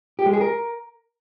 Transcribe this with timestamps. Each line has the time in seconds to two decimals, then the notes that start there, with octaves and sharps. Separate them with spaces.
0.19 G4
0.26 G#3
0.33 G#4
0.41 A#4